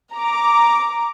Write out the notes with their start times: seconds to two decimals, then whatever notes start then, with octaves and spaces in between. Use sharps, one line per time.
0.14 A#5 D6